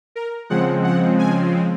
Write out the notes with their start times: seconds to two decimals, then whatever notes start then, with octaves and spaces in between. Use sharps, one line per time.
0.16 A#4
0.50 C#3 F3 G#3 C4 F#5
0.84 F#5
1.19 G#5